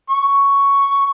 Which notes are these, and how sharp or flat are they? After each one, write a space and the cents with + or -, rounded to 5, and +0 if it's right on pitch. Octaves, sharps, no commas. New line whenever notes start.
C#6 +5